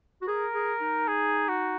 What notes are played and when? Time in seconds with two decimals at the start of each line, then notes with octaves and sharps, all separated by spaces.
0.22 F#4
0.28 G#4 A#4
0.54 G#4
0.81 D#4
1.08 G#4
1.48 F#4